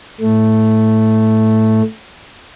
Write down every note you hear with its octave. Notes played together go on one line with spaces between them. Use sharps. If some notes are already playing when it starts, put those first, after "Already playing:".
A2 A3